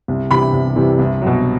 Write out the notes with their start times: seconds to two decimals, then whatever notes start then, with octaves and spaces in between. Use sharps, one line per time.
0.08 C2
0.31 C3 E3 G3 B5
0.53 C2
0.76 C3 E3 G3
0.99 C2
1.21 B2 F#3